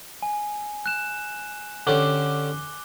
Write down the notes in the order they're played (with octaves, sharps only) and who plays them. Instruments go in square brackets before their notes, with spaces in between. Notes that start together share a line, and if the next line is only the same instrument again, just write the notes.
[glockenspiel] G#5
F#6 E7
[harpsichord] D3 C#4 G4 [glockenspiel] D6 F#6 G7